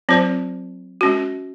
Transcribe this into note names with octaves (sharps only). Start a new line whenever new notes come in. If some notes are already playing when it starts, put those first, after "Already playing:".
F#3 C4 F4 C5
G#3 C#4 F#4